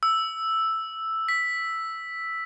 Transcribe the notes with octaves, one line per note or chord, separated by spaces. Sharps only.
E6
B6